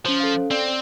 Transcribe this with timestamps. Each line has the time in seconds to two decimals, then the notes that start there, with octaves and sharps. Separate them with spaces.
0.06 F3 C#4 C5
0.20 A4 F5
0.51 C4 D5